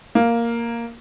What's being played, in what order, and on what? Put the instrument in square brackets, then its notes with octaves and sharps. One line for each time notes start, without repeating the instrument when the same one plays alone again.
[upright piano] A#3